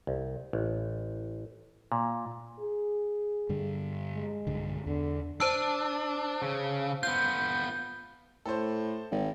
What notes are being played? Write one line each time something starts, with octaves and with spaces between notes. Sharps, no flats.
C2
A1
A#2
G#4
G2 D3 G3
G#3
B1 G2 D3
E2 D3
D4 C5 A5 E6
C#3
B3 F4 G6
A2 A4 C5
G#1